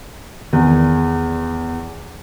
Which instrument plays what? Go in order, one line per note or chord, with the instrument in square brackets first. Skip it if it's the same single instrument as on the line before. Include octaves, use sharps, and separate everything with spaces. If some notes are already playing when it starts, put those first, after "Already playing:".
[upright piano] E2 [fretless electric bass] D#3